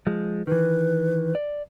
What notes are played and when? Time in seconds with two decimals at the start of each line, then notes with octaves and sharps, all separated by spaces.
0.07 F3 G#3
0.47 D#3 E3 B4
1.35 D5